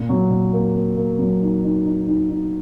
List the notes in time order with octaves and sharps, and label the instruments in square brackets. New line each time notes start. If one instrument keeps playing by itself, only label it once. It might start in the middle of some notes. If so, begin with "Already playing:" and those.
Already playing: [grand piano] A#2
F#3
A#2
A#3
A#3
A#3
F#3
D#4
D#4
D#4
D#4
D#4